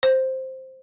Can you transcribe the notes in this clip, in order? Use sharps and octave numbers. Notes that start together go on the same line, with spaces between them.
C5